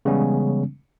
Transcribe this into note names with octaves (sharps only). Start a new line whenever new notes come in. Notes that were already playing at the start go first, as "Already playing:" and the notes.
C#3 E3 G3 G#3 B3 C#4